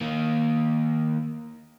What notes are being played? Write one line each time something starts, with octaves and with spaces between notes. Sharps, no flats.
D#3 A#3